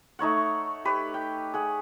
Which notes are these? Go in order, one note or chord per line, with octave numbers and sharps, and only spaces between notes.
A3 D#4 C#5 F#5
G4 B4 C#5
G5
G#4 F#5